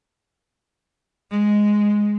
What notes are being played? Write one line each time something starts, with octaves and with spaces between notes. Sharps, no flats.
G#3